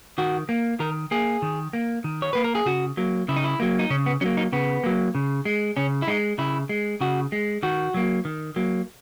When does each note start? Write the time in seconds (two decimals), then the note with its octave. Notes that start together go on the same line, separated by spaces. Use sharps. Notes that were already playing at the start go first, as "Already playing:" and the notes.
0.18 D#3 F#4
0.49 A#3
0.80 D#3 A#4
1.11 A#3 G#4
1.42 D#3
1.73 A#3
2.04 D#3
2.22 C#5
2.33 A#3 B4
2.44 A#4
2.55 G#4
2.66 C#3 F#4
2.97 F#3 A#3
3.28 C#3 E4
3.36 D#4
3.44 E4
3.60 F#3 A#3
3.79 D#4
3.90 C#3 C#4
4.06 B3
4.21 F#3 A#3 C#4
4.37 D#4
4.52 C#3 B3
4.84 F#3 A#3
5.15 C#3
5.45 G#3
5.77 C#3 C#4
6.02 E4
6.08 G#3 D#4
6.38 C#3 E4
6.69 G#3
7.01 C#3 F#4
7.32 G#3
7.63 D#3 F#4
7.94 F#3 A#3
8.25 D#3
8.56 F#3 A#3